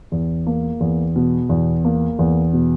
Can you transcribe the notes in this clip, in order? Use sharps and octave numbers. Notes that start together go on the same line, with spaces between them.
E2
A#3
E2
B2
E2
A#3
E2
B2